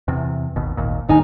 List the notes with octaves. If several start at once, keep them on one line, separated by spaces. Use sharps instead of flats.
E2 C3
G#1 D#2 B2
G#1 D#2 A#2
G1 D#2 D#3 D#4 G#5